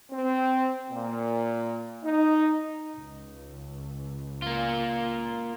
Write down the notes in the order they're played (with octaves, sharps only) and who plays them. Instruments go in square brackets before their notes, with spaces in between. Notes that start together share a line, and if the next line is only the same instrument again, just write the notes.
[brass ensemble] C4
A#2
D#4
[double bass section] C#2
[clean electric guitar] A#3 F4